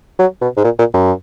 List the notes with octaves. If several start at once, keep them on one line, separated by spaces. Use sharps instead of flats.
F#3
B2
G#2
A#2
A#2
F#2